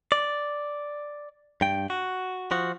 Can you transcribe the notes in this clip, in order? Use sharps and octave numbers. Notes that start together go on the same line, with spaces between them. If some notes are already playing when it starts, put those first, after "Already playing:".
D5
G2 G5
F#4
F3 F#4